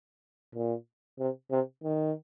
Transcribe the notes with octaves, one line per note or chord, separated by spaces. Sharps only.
A#2
C3
C3
D#3